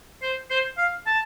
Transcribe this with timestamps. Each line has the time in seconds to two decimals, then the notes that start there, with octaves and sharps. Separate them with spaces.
0.22 C5
0.50 C5
0.77 F5
1.06 A5